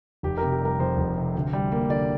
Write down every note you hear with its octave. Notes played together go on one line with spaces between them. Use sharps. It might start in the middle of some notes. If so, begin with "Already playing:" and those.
F1 G4
A#4
C3
G4
G3 A#4
F2 C5
F1
C3
D2
G3
A#3
D3 D5